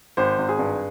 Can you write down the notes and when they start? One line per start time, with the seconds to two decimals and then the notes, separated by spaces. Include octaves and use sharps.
0.17 G#1 C5
0.39 G#1
0.49 G#4
0.59 G2